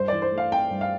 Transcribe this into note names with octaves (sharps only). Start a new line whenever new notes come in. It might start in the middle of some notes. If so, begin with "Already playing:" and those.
Already playing: G2 C5
E3 D5
C5
A3
F5
C4 G5
G2
F5